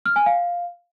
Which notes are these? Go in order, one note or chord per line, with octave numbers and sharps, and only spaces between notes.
F6
G#5
F5